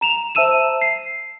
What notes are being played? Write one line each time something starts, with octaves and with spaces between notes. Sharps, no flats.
A#5 E7 F7
C5 E5 A5 E6 D#7 E7
C7